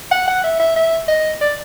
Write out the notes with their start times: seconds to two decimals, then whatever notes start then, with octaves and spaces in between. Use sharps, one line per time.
0.11 F#5
0.28 F#5
0.44 E5
0.60 E5
0.76 E5
1.08 D#5
1.41 D5